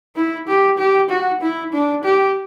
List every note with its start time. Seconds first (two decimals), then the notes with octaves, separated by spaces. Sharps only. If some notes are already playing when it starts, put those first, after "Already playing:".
0.16 E4
0.47 G4
0.78 G4
1.10 F#4
1.41 E4
1.73 D4
2.04 G4